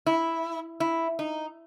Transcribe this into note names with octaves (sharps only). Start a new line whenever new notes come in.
E4
E4
D#4